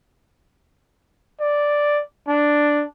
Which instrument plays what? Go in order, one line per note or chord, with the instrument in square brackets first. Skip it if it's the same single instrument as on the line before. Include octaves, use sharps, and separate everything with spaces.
[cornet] D5
D4